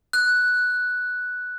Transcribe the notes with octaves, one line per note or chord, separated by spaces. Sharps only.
F#6